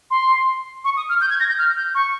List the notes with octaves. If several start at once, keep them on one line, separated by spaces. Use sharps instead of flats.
C6
C#6
D#6
F6
G6
G#6
A#6
G6
F6
G6
C#6